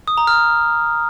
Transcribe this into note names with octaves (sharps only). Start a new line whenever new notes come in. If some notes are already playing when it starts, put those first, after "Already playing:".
D#6
A#5
F6